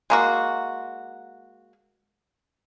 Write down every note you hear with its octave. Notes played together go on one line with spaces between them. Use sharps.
G#3 A#3 F#4